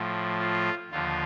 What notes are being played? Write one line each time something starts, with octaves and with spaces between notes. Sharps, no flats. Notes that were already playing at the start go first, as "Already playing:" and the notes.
Already playing: A2 F3
F4
D#2 D3 F3 F4